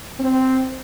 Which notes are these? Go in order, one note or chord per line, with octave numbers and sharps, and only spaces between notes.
C4